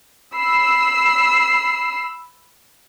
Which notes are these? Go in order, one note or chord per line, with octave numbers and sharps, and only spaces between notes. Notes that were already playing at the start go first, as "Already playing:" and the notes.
B5 E6 C7